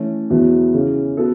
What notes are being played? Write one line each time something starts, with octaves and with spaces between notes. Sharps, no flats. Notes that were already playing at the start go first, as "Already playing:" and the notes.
Already playing: E3 A3 C#4
E2 B2 F#3 B3 E4
C#3 E3 C#4
B3 F#4 A4